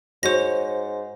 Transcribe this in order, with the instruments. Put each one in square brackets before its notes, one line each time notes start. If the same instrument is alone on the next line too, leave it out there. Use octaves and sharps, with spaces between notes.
[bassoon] G#2 [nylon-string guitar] F#4 C#5 [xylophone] C5 A#6